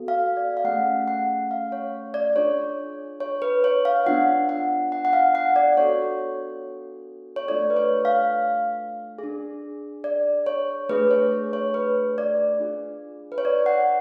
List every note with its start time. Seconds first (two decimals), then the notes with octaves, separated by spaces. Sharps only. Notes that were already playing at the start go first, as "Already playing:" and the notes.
Already playing: B3 F#4 A4
0.08 F5
0.37 D5
0.57 F5
0.64 A3 C#4 G#4 F#5
1.08 F#5
1.51 F5
1.72 C#5
2.14 D5
2.36 D4 F4 G#4 C#5
3.20 C#5
3.42 B4
3.64 C#5
3.85 F5
4.06 B3 D4 F4 F#5
4.49 F#5
4.92 F#5
5.05 F#5
5.13 F5
5.35 F#5
5.56 D5
5.77 B3 D4 F#4 A4 C#5
7.36 C#5
7.48 A3 D4 F4 A4 D5
7.70 B4
7.76 C#5
8.05 F5
9.18 D4 G#4
10.04 D5
10.46 C#5
10.89 A3 D4 G#4 B4
11.11 C#5
11.53 C#5
11.74 B4
12.18 D5
12.59 D4 F4 G#4
13.32 B4
13.38 C#5
13.45 D5
13.66 F#5